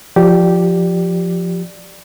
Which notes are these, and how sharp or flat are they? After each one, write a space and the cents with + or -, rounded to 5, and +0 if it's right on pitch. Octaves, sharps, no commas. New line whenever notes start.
F3 +0 G4 -10 D5 +5